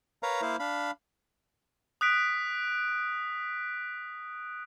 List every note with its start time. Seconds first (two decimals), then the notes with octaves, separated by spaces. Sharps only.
0.23 A#4 B4 C#5 F5 A#5
0.42 A#3 E4 C5 F5
0.59 D4 F5 B5
2.01 D#6 F#6 B6 D7